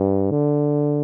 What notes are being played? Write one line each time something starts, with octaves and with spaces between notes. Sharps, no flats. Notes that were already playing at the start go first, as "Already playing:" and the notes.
Already playing: G2
D3